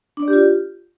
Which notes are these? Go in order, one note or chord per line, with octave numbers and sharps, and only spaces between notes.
D4
D5
G4
F4